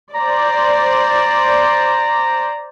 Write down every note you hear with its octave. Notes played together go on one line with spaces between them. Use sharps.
C5 D5 A#5